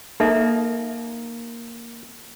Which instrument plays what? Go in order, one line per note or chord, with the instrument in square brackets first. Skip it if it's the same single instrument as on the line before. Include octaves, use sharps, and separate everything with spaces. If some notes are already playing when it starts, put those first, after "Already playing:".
[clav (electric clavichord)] A#3 [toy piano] D#4 A4 E5